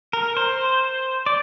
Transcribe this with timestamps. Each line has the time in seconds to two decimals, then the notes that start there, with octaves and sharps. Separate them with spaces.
0.13 A#4
0.37 C5
1.26 D5